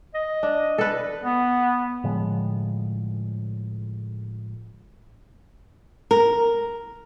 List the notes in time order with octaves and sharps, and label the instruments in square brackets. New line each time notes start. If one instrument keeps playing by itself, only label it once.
[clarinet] D#5
[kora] D4
A4 B4
[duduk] B3
[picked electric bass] A2 D3 F3 G#3
[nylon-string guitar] A#4